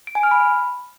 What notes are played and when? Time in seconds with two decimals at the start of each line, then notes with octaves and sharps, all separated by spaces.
0.07 D7
0.15 G#5
0.23 F6
0.31 B5